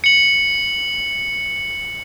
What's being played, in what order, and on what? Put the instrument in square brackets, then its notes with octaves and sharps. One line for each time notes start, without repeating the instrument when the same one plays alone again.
[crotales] C#7 F#7